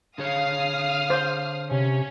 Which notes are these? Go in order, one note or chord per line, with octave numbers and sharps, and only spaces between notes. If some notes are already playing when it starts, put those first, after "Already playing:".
D3 G#4 C#5 F5 D#6 F6
C5
C3 C#4